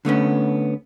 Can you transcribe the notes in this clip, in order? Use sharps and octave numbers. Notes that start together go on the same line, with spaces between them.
D3 A3 B3 C#4